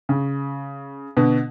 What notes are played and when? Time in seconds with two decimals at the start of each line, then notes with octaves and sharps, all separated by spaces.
0.09 C#3
1.17 B2 D3